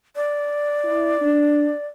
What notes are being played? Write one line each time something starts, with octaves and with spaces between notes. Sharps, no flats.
D5
E4
D4